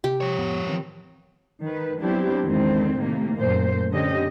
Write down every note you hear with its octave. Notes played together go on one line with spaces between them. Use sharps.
C3 G4
F3 C#5
F2 A2 B3
D#3 E3 C4
D#3 B4
F#3 B3 C4 D4 E4 G4
E2 G#2 D3 D#3 C4
A2 C3 D#3 A3 A#3
F#2 A#2 A3 C5
F#2 D3 C4 C#4 G4 D#5